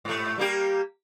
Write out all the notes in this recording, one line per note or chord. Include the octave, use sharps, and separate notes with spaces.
G#2 A3
G3 A#3 G4